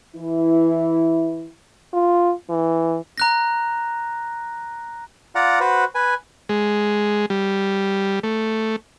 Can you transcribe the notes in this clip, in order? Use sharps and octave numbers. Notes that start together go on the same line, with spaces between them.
E3 E4
F4
E3
A#5 F#6 A#6
F4 D5 F#5 A#5
F#4 B4 C5
B4 G#5
G#3
G3
A3